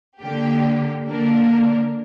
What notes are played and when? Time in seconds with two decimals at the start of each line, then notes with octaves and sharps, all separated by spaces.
0.20 D3 A#3 G4
1.08 D3 A#3 D4 A#4